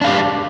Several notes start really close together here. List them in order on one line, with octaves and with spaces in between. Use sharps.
D4 F5 G4